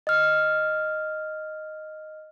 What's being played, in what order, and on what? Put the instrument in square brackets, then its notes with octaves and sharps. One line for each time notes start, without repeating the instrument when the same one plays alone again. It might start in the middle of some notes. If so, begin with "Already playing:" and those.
[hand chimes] D#5 F6